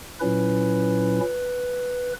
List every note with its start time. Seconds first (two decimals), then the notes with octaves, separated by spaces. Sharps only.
0.20 A#2 F#3 C#4 E4 B4